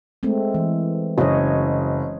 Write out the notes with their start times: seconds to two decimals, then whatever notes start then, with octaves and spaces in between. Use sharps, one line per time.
0.23 G#3 A3 C4
0.54 E3
1.18 F#1 C#5 D#5